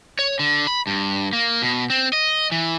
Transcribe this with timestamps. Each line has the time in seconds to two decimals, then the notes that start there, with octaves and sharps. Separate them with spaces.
0.19 C#5
0.39 D3
0.67 B5
0.87 G2
1.33 A#3
1.62 B2
1.90 C4
2.13 D#5
2.52 E3